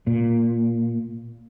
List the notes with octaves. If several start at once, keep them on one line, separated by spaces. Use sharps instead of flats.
A#2